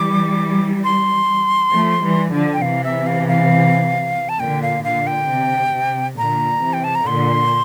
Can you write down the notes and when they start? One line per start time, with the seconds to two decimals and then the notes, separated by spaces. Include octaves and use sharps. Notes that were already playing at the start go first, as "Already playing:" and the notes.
Already playing: E3 G3 D6
0.84 C6
1.72 F3 A3
2.02 E3 G3
2.32 D3 F3
2.53 G5
2.62 C3 E3 F5
2.84 E5
3.07 F5
3.28 F5
4.29 A5
4.39 A#2 D3 G5
4.62 F5
4.84 A#2 D3 F5
5.07 G5
5.29 C3
5.73 C3
6.17 A#2 D3 A#5
6.61 C3 E3
6.73 G5
6.84 A5
6.95 A#5
7.06 A#2 D3 C6